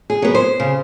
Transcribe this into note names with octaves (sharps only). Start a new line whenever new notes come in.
G#4
F#3 B3
C5
C#3